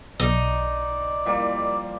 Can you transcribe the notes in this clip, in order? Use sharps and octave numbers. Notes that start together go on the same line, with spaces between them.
B1 D#4 D5
F3 G3 A#3